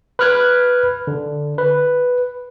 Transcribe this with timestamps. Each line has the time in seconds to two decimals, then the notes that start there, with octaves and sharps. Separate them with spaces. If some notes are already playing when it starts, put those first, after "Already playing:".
0.19 B4 B5 F6 F#6 G#6
1.07 D3
1.58 B4